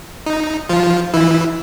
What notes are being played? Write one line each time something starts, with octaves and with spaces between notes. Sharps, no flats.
D#4
F3 F4
E3 E4